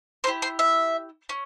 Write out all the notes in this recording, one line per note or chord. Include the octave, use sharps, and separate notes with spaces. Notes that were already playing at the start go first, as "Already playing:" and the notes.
A#3 C5
E4 G4
C5
E5
C#4